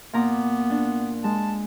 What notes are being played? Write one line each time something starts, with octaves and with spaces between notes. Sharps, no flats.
A#2 B3 A#5 D6
D4
G#3 A5